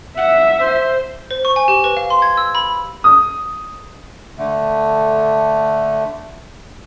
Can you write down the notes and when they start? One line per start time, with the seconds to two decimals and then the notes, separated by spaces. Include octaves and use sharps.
0.17 E5 F#5
0.60 C5
1.31 C5
1.45 C#6
1.56 G#5
1.68 G4
1.84 B4
1.97 F5
2.10 C6
2.22 G#6
2.37 E6
2.55 B5
3.04 D#6
4.38 D3 A3